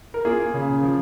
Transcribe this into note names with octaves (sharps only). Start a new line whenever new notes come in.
A#4
A#3 F4 G#4
C#3
F3